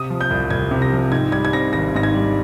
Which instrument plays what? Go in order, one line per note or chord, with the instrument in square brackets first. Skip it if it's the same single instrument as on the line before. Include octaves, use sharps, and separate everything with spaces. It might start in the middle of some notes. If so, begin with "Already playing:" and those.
Already playing: [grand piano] C3 D#6
F3
G6
C2
C2 G#6
C3
A#6
F3
G#2 G#6
G3 G#6
G#6
C4 A#6
G#1 A#6
G#2 A#6
G#6
G3